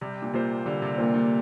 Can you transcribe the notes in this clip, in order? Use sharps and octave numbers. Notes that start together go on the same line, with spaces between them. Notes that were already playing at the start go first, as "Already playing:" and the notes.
C3 G3
A#2
C3 A#3 F4 C5
D3 G3
C3
A#2 A#3 F4 C5
A#2